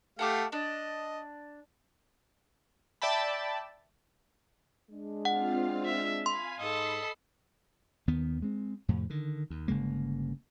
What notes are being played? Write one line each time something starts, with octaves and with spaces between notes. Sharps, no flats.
A3 G4 F5 F#5 A5 D6
D4 D#5
D5 E5 G5 A5 B5
G#3 D4
C4 F4 F5 F#5
E5
F5 G#5 B5 C6
G#2 A4 D#5 B5 C7
D#2 D#3 B3
G#3 C4
F2 A2 C3
D3 D#3
D#2
G1 C#3 G#3 A#3